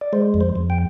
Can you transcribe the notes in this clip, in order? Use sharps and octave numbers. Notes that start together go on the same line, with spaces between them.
D5
G#3 C5
F2
C5
F2
G5